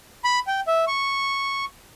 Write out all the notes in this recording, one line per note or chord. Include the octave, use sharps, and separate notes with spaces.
B5
G5
E5
C#6